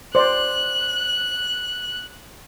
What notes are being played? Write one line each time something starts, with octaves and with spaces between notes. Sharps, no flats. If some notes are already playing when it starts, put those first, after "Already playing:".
C5 D5 F#6